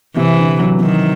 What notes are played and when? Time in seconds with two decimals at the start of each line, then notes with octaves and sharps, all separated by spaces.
0.16 C3 E3
0.38 D3
0.59 F#3
0.80 D#3 F#3